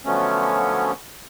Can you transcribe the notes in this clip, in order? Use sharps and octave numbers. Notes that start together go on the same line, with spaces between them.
D3 F3 F#3 A3 B3 C#4